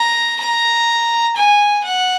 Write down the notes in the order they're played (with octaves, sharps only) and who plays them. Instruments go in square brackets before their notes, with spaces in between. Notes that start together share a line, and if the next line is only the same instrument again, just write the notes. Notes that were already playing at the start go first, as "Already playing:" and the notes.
Already playing: [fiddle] A#5
A#5
G#5
F#5